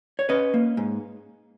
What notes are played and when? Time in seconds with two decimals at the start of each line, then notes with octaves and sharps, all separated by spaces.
0.19 C#5
0.29 C#4 B4 D#5
0.54 A#3
0.77 G#2